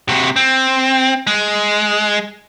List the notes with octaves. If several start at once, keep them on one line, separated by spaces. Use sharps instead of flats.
C3 F#4
C4
G#3